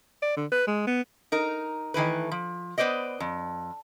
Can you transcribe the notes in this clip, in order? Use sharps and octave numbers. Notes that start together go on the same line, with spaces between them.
D5
D3
B4
G#3
B3
D#4 A#4
D#3 E3 A3 B4
F3
B3 B4 C5 D5 D#5
F2